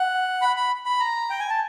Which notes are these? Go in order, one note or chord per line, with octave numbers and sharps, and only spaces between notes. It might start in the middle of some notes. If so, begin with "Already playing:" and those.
Already playing: F#5
B5
B5
B5
A#5
G5
G#5
A5